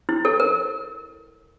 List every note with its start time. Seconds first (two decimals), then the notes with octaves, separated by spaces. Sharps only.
0.09 E4
0.25 A4
0.40 A#4